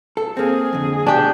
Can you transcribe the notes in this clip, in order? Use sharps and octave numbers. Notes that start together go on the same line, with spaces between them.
A4
A#3 C4 G#4
F2 D3
B2 D4 G4 G#5